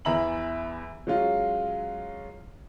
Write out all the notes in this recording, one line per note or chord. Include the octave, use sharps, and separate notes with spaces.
E2 E3 E5 A#5 B5 F#7
F#3 G#3 C#4 F4